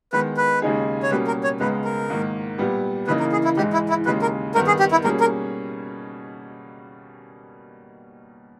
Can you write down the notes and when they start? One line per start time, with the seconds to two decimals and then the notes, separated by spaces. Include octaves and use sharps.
0.13 D#3 G#3 B3 B4
0.37 B4
0.62 D#2 C#3 G#3 D#4 G#4
1.03 C#5
1.11 B2 G3 A#3 C#4 G4 B4
1.27 A#4
1.44 C#5
1.60 C#2 C#3 G#3 B3 B4
1.85 A#4
2.10 G#2 D#3 A#3
2.58 A#2 G3 B3 G4
3.07 C#3 E3 A#3 D#4 B4
3.20 A#4
3.32 G#4
3.44 E4
3.57 G#2 E3 G#3 D#4 G4
3.73 E4
3.89 E4
4.06 D#2 C#3 G#3 B4
4.22 A#4
4.55 G2 D#3 G3 B3 A#4
4.67 G#4
4.79 G4
4.92 E4
5.04 B2 G3 A#3 C#4 G#4 A#4
5.20 A#4